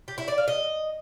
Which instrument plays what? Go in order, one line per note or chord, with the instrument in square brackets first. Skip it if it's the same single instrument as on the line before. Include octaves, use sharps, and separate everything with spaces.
[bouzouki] G4
E4
D5
F5
D#5